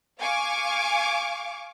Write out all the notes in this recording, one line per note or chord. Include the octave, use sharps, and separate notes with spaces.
F5 G#5 C#6 D6